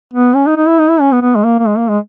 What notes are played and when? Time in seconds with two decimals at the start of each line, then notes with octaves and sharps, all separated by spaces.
0.14 B3
0.35 C#4
0.47 D#4
0.57 D#4
0.67 E4
0.79 D#4
0.90 E4
1.01 C#4
1.12 B3
1.22 B3
1.36 G#3
1.44 A#3
1.59 A#3
1.67 G#3
1.78 A#3
1.89 G#3